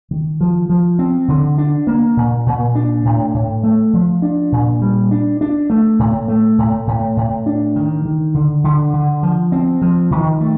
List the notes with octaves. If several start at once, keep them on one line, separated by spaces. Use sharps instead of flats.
D#3
F3
F3
C4
D3
D4
A#3
A#2
A#2
D4
A2
A2
A3
F3
D4
A#2
G3
D4
D4
A3
A2
A3
A2
A2
A2
D4
D#3
D#3
D3
D3
D3
F3
C4
F3
D#3
A3